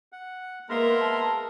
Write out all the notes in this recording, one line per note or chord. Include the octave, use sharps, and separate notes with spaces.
F#5
G#3 A#3 B3 A#4 E5 A#5 C6
A5